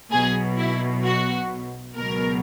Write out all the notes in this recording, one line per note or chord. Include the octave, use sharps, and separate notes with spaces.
B1 B2 F#3 G#4
E4
F#4
C#2 B2 F#3 A#4